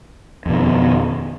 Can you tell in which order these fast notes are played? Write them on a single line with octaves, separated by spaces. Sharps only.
F2 B2 E3 D#3